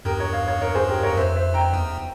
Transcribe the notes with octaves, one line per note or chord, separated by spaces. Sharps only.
E2 G2 G4 A#4
A#4 C#5
C#5 F5
C#5 F5
A#4 C#5
G#4 C5
G4 A#4
A#4 C#5
E2
F2 C5 E5
C5 E5
G5 A#5
E2